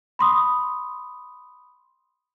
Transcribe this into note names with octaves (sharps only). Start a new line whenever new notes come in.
B5 C6 D#6